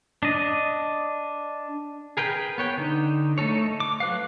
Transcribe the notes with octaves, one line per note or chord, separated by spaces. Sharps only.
D4 D#5
G#4 A#4 B4 G5
B3 C#5 G5
D3 D#4
A3 D#4 A4 C#5
D6
F#3 B4 F5